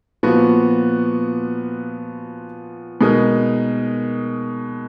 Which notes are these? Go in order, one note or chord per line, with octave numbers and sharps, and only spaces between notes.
A#2 F3 B3 F#4
B2 G#3 D#4 A#4